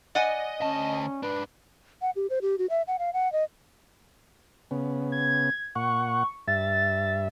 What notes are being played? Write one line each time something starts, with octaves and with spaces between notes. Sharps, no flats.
D5 D#5 F#5 G#5
D2 C#4 A5
G#2 D4 B4
F#5
G4
C5
G4
F#4
E5
F#5
F5
F#5
D#5
C#3 B3
G#6
A#2 F#5 C#6
G2 E5 A6